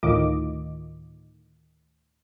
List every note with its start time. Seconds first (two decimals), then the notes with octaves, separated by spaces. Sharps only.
0.03 D2 A2 D#3 F4 D#5 D6